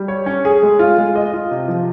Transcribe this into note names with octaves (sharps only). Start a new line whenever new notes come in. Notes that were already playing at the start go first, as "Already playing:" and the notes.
Already playing: G3
C#5
C#4
G#4
G#3
F4
G#3
D#5
F4
C3
F3